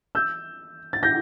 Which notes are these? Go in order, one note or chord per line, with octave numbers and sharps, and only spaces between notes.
E6 G6
A6
G6 A#6